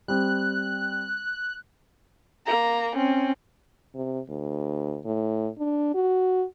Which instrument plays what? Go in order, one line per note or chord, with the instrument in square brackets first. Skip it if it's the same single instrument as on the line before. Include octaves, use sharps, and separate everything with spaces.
[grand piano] G3 C4 [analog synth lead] F#6
[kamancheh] A#3 A#5
C4 C#4
[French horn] C3
D2
A2
D4
F#4